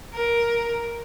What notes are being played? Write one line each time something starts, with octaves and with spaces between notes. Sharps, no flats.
A#4